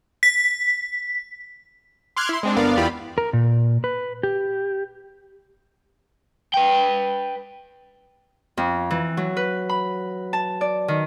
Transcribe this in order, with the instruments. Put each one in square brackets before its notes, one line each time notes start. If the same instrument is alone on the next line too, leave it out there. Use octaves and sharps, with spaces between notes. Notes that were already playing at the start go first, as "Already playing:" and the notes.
[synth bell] B6
[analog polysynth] C6 D6 F6 F#6 G#6
E4 C6
G#3 C4 D4
G1 B3 D4 A#4 D5 F5
E2 E4 F4 G4 D5 B5
[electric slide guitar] A#4
A#2
B4
G4
[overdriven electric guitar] B4 G5
[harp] F2
E3
F#3
B4
B5
A5
D5
D#3